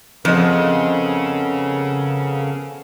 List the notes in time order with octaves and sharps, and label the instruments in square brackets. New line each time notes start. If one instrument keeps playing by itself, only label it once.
[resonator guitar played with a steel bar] F2 [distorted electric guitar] C#3 [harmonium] B3 A4 A#4 [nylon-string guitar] C5 D#5